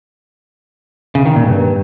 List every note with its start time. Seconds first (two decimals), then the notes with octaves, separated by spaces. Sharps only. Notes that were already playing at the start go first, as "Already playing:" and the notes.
1.15 C#3
1.26 D#3
1.36 A#2
1.47 G2